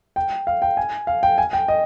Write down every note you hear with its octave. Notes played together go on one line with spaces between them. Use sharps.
G5
F5
G5
G#5
F5
G5
G#5
G5
D#5